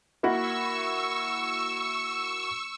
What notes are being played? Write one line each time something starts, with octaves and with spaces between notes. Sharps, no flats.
A#3 E4 F#4 C#6 E6